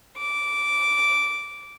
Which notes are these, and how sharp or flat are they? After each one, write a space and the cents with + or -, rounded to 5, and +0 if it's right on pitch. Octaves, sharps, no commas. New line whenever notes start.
D6 -10